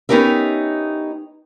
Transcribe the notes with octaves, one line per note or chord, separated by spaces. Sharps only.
B3 C#4 D#4 G4 A#4 E5